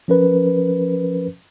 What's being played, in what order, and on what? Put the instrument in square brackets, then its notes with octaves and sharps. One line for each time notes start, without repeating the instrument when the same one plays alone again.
[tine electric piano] F3 C#4 A#4 B4